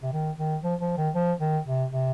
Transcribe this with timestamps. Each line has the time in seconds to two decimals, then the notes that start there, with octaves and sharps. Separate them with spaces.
0.03 C3
0.13 D#3
0.38 D#3
0.63 F3
0.81 F3
0.97 D#3
1.15 F3
1.40 D#3
1.66 C3
1.91 C3